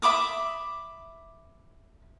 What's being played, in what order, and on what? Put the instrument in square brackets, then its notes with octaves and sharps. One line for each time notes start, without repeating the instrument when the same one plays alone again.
[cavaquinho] E5 B5 D6 D#6